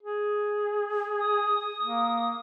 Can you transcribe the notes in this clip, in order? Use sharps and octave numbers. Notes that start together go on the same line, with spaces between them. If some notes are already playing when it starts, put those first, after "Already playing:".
G#4
D#6
A#3